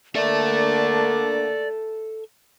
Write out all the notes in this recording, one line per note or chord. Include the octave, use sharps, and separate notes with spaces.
D3 A#3 D4 A4 D5 E5